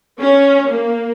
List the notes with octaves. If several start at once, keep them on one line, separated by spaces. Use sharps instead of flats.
C#4
A#3